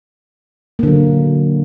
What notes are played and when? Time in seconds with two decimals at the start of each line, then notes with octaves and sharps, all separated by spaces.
0.79 A#3
0.83 D3
0.87 F#3